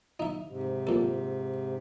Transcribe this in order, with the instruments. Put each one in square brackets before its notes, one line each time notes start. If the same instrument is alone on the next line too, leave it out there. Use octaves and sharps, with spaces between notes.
[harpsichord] D#4 E5
[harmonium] G#2 C3
[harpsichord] A#2 A4